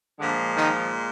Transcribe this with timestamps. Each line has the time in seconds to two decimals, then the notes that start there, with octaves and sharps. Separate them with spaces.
0.19 A#2 D3 F3 G#3 D4
0.57 D#3 D#4